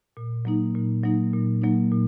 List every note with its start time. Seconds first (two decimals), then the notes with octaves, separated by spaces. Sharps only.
0.17 A#2
0.45 F#3 A#3 D#4
0.75 A#2
1.04 F#3 A#3 D#4
1.33 A#2
1.62 F#3 A#3 D#4
1.92 A#2